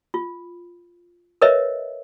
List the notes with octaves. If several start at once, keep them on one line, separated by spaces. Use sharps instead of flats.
F4
A#4 B4 C#5 D#5 E5